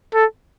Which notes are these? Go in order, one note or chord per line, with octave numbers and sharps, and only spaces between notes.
A4